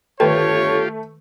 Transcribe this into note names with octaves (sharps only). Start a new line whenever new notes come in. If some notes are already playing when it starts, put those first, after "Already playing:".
G1 D#3 A3 F4 G4 B4 C#5 G5